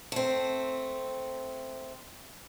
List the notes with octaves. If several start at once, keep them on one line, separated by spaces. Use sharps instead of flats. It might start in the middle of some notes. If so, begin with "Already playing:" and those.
A3 C4